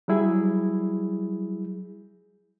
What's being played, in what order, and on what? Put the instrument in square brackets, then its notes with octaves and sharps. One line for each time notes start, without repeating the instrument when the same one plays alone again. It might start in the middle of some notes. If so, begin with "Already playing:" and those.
[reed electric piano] F#3 G3 E4 G#4